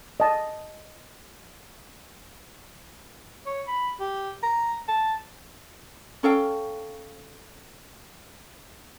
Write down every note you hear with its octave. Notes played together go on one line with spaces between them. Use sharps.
D#5 A5
C#5
B5
G4
A#5
A5
C#4 A4 F5 G5